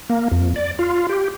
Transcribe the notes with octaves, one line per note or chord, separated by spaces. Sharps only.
A#3
F2
D5
F4
G4